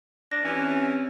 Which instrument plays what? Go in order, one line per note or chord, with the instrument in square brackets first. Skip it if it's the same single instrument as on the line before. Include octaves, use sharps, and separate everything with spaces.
[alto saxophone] D4 [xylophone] A#6
[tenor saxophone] E3 [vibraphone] C4 G4 C#5 [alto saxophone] C#4